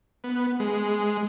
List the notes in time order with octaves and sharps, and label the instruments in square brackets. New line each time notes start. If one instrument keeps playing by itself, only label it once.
[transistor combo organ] B3
G#3